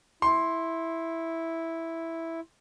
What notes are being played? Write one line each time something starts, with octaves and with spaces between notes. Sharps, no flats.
E4 C6